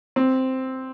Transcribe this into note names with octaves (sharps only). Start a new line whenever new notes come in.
C4